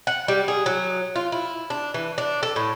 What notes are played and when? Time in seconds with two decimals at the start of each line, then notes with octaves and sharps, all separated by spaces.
0.07 F#5
0.28 G3
0.48 G#4
0.66 F#3
1.15 F4
1.32 E4
1.70 D4
1.94 E3
2.18 D4
2.43 A4
2.56 A2